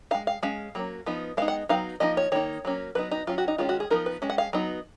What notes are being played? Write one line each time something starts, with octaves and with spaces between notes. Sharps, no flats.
G#3 D#4 F5
F5
G#3 C#4 F5
F#3 A#3 C#4
F3 B3 D#4
G#3 B3 D#4 F5
F#5
F#3 B3 D#4 F5
F3 A#3 D#4 D#5
C#5
D#3 A#3 D#4 C#5
F#3 A#3 C#4
F#3 B3 D#4 B4
D#4
F#3 C#4 F4
F#4
D#4
D#3 G#3 C#4 F4
F#4
G#4
F3 B3 D#4 A#4
B4
G#3 C#4
F#5
F5
F#3 B3 D#4